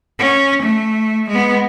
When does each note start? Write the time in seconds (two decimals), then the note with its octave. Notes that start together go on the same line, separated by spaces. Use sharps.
0.19 C#4
0.63 A3
1.30 G#3 B3